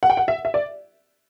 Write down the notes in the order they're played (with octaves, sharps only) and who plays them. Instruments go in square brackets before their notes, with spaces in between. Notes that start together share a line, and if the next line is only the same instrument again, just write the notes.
[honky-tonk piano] F#5
G5
F#5
E5
E5
D5